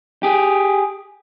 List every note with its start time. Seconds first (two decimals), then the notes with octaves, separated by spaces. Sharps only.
0.23 G4 G#4